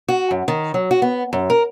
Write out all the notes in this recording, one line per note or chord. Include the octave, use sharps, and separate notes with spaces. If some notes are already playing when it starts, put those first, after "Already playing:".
F#4
F#2
D#3
F#3
F#4
B3
F#2
A#4